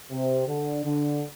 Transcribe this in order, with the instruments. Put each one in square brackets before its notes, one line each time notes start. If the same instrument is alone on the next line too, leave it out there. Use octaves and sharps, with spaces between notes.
[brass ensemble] C3
D3
D3